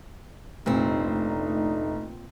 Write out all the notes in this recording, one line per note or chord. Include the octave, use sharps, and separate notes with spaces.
F1 A#2 A3 C4 D4 D#4